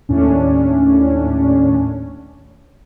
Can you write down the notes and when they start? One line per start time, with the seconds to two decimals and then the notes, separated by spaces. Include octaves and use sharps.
0.09 D#2 A2 C#4 D4